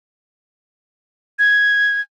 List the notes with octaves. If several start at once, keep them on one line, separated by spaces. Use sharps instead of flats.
G#6